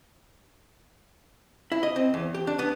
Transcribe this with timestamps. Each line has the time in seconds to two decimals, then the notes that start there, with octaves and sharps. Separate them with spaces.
1.72 E4
1.83 D#5
1.96 C4
2.14 E2
2.35 G4
2.47 D4
2.59 B3